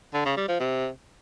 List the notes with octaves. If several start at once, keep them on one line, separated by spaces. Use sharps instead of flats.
D3
C#3
G3
F3
C3